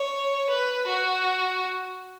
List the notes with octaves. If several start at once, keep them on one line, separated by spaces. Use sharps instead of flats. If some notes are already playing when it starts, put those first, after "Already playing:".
Already playing: C#5
B4
F#4